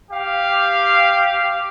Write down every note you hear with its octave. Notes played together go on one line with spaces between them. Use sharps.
G4 F5